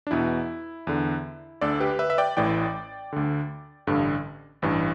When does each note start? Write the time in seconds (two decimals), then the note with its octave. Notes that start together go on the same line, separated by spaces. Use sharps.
0.07 D4
0.11 E2 B2 E4
0.87 E2 D3
1.61 D2 D3 A4 D5
1.80 G4 B4
1.99 B4 E5
2.10 E5
2.18 D5 G5
2.37 A1 A2 E3 D5 G5
3.13 D2 D3
3.87 A1 G2 D3
4.62 A1 G2 E3